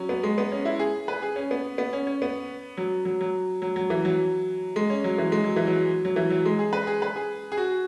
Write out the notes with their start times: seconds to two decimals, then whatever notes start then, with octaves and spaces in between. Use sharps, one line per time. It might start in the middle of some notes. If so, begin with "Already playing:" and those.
Already playing: F#3 C#4
0.09 B3
0.23 G#3
0.38 B3
0.52 C#4
0.65 E4
0.79 G#4
1.08 B4
1.22 G#4
1.36 C#4
1.51 B3
1.78 B3
1.93 C#4
2.07 C#4
2.22 B3
2.77 F#3
3.05 F#3
3.21 F#3
3.62 F#3
3.76 F#3
3.90 E3
4.05 F#3
4.76 G#3
4.90 C#4
5.04 F#3
5.18 E3
5.32 G#3
5.44 F#3
5.56 E3
5.67 F#3
6.05 F#3
6.16 E3
6.30 F#3
6.45 G#3
6.59 G#4
6.73 B4
6.87 G#4
7.02 B4
7.16 G#4
7.52 G#4
7.57 F#4